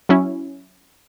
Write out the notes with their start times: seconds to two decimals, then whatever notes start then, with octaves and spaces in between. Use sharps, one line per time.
0.09 F#3 C#4 E4